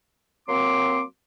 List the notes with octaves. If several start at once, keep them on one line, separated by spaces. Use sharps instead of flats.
F#3 A#3 C4 C6 D6